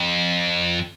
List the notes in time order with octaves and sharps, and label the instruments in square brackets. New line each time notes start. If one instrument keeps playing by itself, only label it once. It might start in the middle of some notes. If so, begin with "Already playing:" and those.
Already playing: [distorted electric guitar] F2